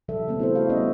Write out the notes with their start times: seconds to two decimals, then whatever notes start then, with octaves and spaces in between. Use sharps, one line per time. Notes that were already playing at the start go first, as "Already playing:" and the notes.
0.08 C#3 F3 G3 A4 E5
0.28 C#3 A3 B3 C4
0.40 E4 F#4 A4 C5
0.55 F#4 F5
0.69 G3 B3 C#4 D#5 E5